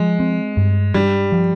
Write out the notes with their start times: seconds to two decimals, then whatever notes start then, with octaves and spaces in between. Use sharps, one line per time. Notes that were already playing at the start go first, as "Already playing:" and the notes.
Already playing: F3 G#3
0.19 C4
0.57 G2
0.94 G2 G3
1.32 F3